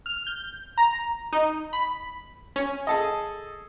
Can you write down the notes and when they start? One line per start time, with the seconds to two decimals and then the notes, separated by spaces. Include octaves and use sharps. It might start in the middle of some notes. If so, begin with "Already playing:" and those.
0.06 F6
0.27 G6
0.78 A#5
1.33 D#4
1.73 B5
2.56 C#4
2.87 G#4 A4 D#5